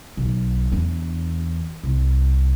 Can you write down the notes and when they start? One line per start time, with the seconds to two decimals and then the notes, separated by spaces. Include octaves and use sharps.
0.17 B1
0.72 E2 D4
1.83 C2